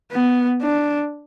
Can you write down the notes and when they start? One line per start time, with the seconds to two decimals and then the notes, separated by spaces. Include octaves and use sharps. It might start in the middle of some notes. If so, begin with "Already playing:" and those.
0.12 B3
0.62 D4